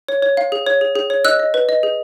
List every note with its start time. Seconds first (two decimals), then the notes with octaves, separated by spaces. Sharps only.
0.09 C#5
0.22 C#5
0.37 F5
0.52 G#4
0.66 C#5
0.81 G#4
0.96 G#4
1.10 C#5
1.25 D#5 E6 F#6
1.39 D#5
1.54 B4
1.69 D#5
1.83 G#4